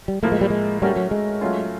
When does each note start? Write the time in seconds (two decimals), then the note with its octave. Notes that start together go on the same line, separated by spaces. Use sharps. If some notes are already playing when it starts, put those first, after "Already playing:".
0.08 G3
0.23 A2 F3 A3 A#3
0.32 G#3
0.41 G3
0.50 G#3
0.82 G3 A3 C#4 F#4 A#4
0.96 F#3
1.11 G#3
1.41 F#3 A3 C#4 F4